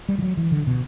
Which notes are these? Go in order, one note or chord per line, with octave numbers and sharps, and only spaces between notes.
G3
E3
F#3
E3
D3
B2